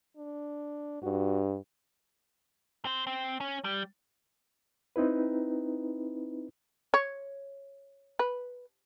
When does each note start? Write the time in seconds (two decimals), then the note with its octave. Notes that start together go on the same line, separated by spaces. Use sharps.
0.17 D4
1.03 G2 F#4
2.85 C4 C5
3.07 C4
3.40 C#4
3.64 G3
4.96 C4 D#4 E4 B4
6.94 C#5
8.19 B4